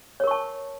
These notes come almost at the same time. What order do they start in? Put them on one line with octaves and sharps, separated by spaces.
C#5 A#4 C#6 A5